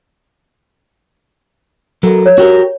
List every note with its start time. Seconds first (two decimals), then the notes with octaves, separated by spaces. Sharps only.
2.03 F#3 A4 A#4
2.26 C#5
2.38 F#4 G4 A#4